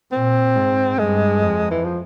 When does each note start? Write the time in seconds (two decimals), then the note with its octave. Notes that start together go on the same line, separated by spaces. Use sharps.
0.12 A#2 C4
0.55 G#2
0.99 G2 G#3
1.42 F2
1.71 E3
1.85 F3